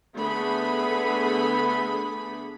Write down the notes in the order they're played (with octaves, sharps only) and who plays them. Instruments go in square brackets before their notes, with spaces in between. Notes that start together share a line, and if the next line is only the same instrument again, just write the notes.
[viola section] D3 A3 B3 G#4 B5